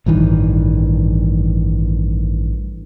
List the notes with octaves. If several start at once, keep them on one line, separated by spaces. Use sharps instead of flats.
A1 G2 D#3 E3